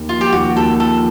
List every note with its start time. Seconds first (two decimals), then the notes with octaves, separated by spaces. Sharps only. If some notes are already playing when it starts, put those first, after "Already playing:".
Already playing: D#2
0.09 F3 F4
0.21 G4
0.32 D#2 F#4
0.56 D#2 A4
0.80 F3 A4